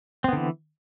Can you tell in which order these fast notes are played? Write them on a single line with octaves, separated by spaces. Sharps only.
C4 B3 D3 E3